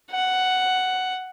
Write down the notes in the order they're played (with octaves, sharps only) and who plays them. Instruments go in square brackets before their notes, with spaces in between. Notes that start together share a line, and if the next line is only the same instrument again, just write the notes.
[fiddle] F#5